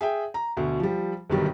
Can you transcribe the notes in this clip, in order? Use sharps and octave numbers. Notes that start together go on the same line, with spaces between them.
G#4 E5 G5
A#5
D2 B2
F3 G3
G1 B2 D#3 F#3 G3